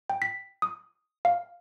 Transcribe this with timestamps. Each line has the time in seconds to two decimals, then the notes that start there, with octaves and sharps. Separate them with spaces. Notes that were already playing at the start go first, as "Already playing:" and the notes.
0.10 G5
0.22 B6
0.62 D#6
1.25 F5